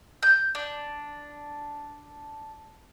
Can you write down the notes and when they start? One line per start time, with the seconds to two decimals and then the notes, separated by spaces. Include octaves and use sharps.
0.23 G6
0.55 D4